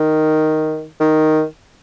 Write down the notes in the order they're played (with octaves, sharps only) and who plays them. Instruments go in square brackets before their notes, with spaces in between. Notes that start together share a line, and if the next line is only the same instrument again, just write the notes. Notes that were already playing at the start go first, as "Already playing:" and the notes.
Already playing: [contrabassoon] D#3
D#3